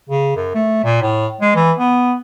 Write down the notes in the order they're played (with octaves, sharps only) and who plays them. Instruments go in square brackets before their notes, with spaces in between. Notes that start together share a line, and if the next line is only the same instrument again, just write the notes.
[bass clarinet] C#3
F#2
A3
A#2
A2
G#3
E3
B3